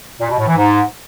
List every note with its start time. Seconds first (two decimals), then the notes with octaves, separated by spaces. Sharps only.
0.21 A#2
0.29 B2
0.38 A2
0.47 E3
0.56 G#2